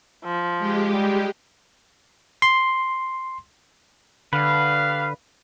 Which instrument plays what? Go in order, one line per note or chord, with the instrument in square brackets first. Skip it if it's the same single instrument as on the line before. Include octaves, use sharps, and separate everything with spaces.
[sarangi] F3
[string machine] G#3 G4
[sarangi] G3
[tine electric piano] C6
[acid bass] D3 [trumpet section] G3 F5 [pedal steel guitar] B4